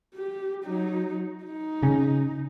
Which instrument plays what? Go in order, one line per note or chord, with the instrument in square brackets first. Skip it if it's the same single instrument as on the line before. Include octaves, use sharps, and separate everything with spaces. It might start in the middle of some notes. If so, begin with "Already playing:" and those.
[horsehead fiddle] G4
F#3 D#4
D#4
[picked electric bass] C#3 C#4